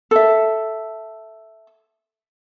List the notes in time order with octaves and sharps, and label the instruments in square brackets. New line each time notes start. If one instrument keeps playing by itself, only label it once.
[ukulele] A4 E5